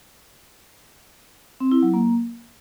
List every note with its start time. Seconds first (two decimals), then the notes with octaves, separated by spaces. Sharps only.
1.60 C4
1.71 E4
1.83 F#3
1.94 A#3